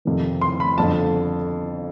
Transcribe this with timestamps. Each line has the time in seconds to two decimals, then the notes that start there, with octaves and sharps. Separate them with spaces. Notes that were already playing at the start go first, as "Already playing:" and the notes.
0.05 F2 C3 D#3
0.41 C6
0.60 B5
0.77 G1 F2 D3 A5